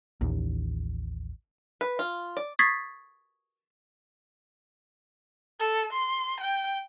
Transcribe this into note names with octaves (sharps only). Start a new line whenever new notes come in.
A1 D#2
B4
F4
D5
C#6 D#6 G#6 A6 B6 C7
A4
C6
G5